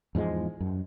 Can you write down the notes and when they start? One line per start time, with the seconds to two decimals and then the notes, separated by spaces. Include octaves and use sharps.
0.15 E2 G#2 F3 G#3
0.60 F#2